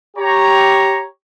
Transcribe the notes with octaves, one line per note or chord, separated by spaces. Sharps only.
G4 C#5 A#5